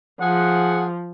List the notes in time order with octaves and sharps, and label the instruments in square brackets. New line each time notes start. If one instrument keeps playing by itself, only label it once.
[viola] F3 [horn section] G#4 F#5